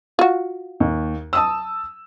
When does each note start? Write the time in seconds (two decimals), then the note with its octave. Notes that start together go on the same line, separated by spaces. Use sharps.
0.19 F4 F#4
0.80 D#2
1.33 A5 D#6 E6